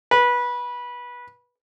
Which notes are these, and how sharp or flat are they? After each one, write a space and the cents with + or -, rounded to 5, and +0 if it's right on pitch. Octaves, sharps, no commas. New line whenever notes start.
B4 -20